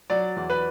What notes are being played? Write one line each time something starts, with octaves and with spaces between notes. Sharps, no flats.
F#3 D5
E2
B4